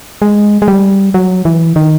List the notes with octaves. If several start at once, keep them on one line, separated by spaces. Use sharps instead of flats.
G#3
G#3
G3
F#3
E3
D#3